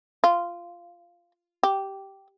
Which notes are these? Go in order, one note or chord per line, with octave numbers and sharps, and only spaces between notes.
F4
G4